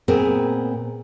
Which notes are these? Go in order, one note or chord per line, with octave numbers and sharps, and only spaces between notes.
A#2 B3 C4 G#4 A#4